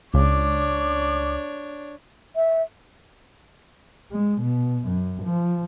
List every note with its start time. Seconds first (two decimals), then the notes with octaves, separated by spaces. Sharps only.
0.14 C#2 D4 C#5 D6
2.36 E5
4.11 G#3
4.41 B2
4.87 F#2
5.23 F3